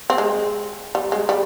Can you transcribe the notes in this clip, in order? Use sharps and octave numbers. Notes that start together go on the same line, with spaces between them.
C4
G#3
G3
G#3
G3